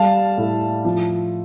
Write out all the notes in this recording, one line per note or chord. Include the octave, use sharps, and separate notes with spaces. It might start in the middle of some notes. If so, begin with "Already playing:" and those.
Already playing: G3 F5 A5
A2
F3